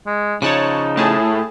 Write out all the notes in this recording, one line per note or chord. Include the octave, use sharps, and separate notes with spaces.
G#3
C#3 F3 D#4 C#5 A5 F#6
A2 G#4 A5